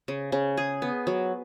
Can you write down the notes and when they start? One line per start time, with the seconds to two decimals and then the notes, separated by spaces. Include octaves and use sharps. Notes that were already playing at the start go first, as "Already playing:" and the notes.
0.08 C#3
0.32 C#3
0.57 G#4
0.82 B3
1.07 F#3